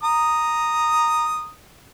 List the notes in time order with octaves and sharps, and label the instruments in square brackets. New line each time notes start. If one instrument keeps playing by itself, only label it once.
[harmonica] A#5 D#6